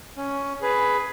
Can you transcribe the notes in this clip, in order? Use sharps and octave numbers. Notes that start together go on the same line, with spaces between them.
C#4
G#4 B4